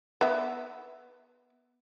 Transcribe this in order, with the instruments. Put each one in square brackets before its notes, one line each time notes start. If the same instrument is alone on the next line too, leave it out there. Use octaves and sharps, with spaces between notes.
[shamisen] B3 E5